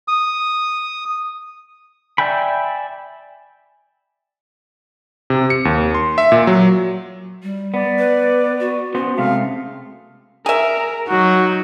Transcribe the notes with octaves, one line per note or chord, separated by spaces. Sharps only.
D#6
D5 E5 G5 G#5 B5
C3
C#7
D#2
C6
E5
A#2
F#3
G3
B3 D5
B4
F#4
B3 C#4 F#4 C5
C3 G#3 A3 F5
G#4 A#4 E5
F#3 D#4 F#4